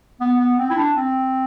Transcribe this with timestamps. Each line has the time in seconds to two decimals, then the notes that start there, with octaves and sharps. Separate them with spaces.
0.21 B3
0.39 B3
0.59 C4
0.70 E4
0.77 D4
0.96 C4